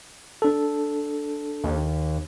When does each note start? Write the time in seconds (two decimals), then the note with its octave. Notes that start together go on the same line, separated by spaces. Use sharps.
0.42 D4 A4
1.64 D#2